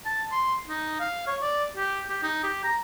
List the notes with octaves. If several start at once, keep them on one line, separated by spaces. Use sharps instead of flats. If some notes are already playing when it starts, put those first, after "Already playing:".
A5
C6
D#4
F5
C#5
D5
G4
G4
D#4
G4
A#5